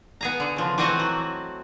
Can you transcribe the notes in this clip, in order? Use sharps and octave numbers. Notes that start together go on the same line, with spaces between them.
B3 G#4 A#5
D3
C#3 F3
E3 A3 C4 F#4 D#5
F#3